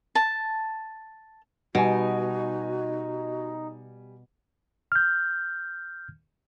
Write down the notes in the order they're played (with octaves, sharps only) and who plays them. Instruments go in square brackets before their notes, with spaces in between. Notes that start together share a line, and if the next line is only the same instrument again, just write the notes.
[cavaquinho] A5
[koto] B2 [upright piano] G3 G#5 [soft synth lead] D#4 [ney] F#4
[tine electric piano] F6 G6